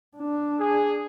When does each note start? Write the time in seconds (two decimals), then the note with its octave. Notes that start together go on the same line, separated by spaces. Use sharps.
0.17 D4
0.59 G#4